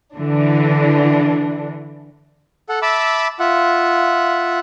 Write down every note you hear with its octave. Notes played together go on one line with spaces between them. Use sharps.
D3 E3 D4
A4 F#5
E5 A5 B5 D6 E6
F4 E5 F#5